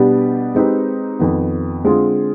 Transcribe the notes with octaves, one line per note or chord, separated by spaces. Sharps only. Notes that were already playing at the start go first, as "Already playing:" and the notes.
Already playing: B2 G3 B3 D4 G4
G#3 C4 D#4 G4 B4
F2 D#3 B3
D3 G#3 C4 F4 G#4